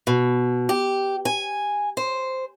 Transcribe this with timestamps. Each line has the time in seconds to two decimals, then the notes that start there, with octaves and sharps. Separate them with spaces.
0.07 B2
0.69 G4
1.25 G#5
1.97 C5